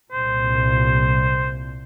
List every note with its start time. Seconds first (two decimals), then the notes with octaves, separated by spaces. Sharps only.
0.12 C2 A#2 C5